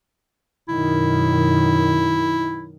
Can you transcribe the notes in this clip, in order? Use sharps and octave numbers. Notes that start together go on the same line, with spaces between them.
F#2 B2 D#3 E4